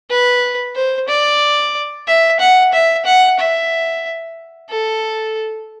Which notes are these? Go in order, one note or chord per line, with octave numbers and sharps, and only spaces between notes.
B4
C5
D5
E5
F#5
E5
F#5
E5
A4